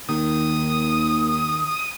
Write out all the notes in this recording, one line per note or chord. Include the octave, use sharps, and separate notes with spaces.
D#2 D#3 D#6